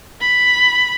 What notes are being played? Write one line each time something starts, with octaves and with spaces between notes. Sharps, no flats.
B5